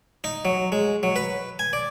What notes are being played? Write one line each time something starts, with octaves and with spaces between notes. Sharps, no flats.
D#4
F#3
G#3
F#3
B4
G#5
D5